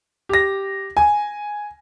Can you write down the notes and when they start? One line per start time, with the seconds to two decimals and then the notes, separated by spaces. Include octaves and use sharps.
0.29 G4 A#6
0.97 G#5